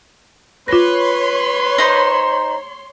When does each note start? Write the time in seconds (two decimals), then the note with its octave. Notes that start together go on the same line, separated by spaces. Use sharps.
0.68 F4 B4 C#5 C6 A#6
1.78 D#4 C5